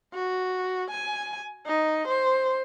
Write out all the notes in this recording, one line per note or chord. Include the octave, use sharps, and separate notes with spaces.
F#4
G#5
D#4
C5